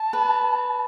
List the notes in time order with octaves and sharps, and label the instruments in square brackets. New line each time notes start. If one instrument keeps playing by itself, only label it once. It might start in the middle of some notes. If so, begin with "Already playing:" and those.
Already playing: [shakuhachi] A5
[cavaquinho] B4